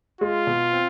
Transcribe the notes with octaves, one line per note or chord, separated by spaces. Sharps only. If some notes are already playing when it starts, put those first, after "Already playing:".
G#3 F4
B2
C4